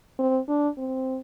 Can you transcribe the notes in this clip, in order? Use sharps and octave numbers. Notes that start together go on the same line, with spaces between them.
C4
D4
C4